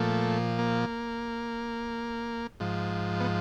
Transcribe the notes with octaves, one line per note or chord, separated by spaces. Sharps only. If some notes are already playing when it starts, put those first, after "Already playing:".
Already playing: A#2 F3 A3
A#3
G#2 F3
B3